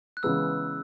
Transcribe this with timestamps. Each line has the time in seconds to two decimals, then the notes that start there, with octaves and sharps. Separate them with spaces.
0.17 F#6
0.23 C#3 E3 G#3 B3 E6